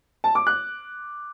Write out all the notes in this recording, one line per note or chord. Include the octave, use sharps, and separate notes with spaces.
A5
D6
F#6